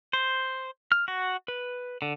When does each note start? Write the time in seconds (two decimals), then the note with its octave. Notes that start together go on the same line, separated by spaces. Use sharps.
0.13 C5
0.92 F6
1.08 F#4
1.48 B4
2.02 D3